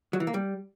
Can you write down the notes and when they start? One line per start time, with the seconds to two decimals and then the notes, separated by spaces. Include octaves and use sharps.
0.13 F#3
0.20 E3
0.27 A#3
0.34 G3